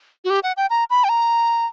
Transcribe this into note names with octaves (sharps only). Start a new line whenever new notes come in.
F#4
G4
F#5
G5
A#5
B5
G5
A#5